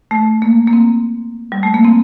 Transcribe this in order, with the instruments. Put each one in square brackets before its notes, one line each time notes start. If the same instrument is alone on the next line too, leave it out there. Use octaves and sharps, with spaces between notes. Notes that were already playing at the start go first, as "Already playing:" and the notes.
[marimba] A3
A#3
A#3
C4
G3
A3
A#3
C4